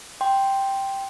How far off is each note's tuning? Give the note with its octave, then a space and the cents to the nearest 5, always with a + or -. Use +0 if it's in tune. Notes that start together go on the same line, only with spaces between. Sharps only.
G5 +0 C6 +0